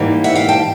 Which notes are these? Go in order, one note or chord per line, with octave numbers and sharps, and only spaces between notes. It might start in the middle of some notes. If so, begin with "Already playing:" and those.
Already playing: G#2 E3 G3 A#3
E5 F#5
F5 G5
G5 A5